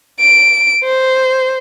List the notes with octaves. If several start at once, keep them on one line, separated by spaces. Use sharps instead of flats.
D7
C5